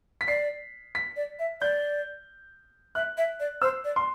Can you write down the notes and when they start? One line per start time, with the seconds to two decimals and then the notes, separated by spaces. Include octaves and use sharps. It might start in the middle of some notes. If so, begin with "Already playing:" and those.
0.21 B6
0.28 D5 C7
0.95 B6
1.16 D5
1.39 E5
1.61 D5 G6
2.95 E5 F#6
3.17 E5
3.40 D5
3.62 C5 E6
3.84 D5
3.96 C6